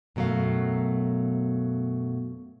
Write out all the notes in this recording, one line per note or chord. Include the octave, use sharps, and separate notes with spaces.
F#2 B2 F#3 A3 F5